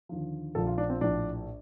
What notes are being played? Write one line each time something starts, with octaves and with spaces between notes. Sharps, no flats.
D#2 D3 F3
A#1 A#2 F3 A4
F4
D4
C4
A#1 A2 F3 D4